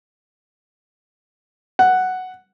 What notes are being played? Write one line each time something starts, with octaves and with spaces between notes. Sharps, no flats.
F#5